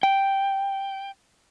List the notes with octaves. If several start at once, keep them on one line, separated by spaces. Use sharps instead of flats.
G5